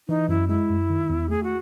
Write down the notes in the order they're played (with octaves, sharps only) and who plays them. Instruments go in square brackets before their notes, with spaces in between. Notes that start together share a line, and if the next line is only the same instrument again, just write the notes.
[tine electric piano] E3 [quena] D#4
[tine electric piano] F#2 [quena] E4
[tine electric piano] G#3 [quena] E4
[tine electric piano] F#2
D#3
E2
[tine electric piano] A3 [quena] G#4
[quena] F#4